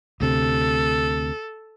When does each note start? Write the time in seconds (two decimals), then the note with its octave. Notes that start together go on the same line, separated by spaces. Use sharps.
0.21 D2 C3 A4